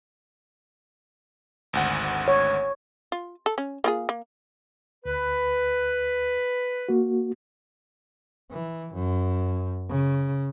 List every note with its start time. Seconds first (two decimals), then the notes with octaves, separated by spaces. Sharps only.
1.73 G#1 D2 F#5
2.28 C#5
3.12 F4
3.46 A4
3.58 C#4
3.84 A#3 F4 G#4
4.09 A#3
5.06 D2 B4
6.89 A#3 F#4
8.51 E3
8.93 F#2
9.89 C#3